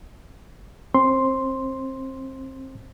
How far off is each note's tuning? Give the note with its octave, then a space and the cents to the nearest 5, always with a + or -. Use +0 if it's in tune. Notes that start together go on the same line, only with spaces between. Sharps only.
C4 +25 C6 +0